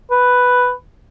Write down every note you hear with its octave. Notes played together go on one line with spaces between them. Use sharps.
B4